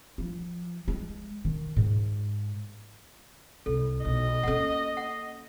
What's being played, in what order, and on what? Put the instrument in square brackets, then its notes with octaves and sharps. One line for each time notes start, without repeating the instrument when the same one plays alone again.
[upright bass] F3
G#3
D#3
G#2
[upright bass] C2 [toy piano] A4
[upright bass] B1 [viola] D#5
[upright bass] A#3 C#4 [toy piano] A4 F#5
[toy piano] F#5